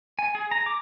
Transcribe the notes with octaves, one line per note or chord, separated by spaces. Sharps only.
G#5
G#4
A#5
D6